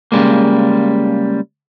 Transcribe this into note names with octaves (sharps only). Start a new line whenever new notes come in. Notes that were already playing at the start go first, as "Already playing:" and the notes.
C#3 F3 G3 G#3 A#3